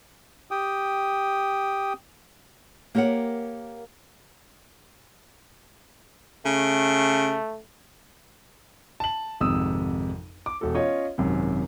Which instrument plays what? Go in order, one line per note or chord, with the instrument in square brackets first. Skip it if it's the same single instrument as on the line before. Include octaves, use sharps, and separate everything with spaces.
[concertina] G4 G5 D#6
[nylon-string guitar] A#3 G4 A#4 C#5 F#5
[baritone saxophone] C#3 [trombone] A3
[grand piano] A5 F#7
G#1 F2 G#2 C3 D#6 E6
D6
E1 A4
C#4 F4 C#5 D#5
G#1 F#2 C3